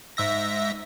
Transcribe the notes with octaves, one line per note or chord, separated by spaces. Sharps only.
G#2 E5 A#6